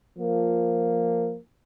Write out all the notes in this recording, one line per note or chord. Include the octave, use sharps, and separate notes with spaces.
F3 A#3